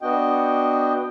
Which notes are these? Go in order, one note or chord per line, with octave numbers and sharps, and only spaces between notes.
B3 D4 F#4 D#5 G5